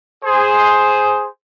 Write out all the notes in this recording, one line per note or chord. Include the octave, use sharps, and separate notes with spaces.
G#4 C5